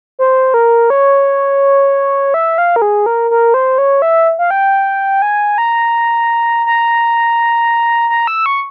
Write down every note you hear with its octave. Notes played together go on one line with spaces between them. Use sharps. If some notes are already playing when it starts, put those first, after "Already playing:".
C5
A#4
C#5
E5
F5
A#4
G#4
A#4
A#4
C5
C#5
E5
F5
G5
G#5
A#5
A#5
A#5
E6
C#6